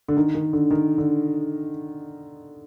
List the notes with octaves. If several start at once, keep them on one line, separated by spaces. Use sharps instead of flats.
D3
D#3
D#3
D3
D#3
D3